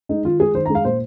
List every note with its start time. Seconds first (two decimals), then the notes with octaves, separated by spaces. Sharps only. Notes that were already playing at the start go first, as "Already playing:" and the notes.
0.09 G#3 D#4
0.25 D#3 F4
0.40 G#3 G#4
0.54 D#3 C5
0.65 A#5
0.70 G#3
0.75 F5
0.85 A#2 C5